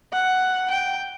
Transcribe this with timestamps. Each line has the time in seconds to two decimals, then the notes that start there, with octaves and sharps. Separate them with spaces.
0.13 F#5
0.70 G5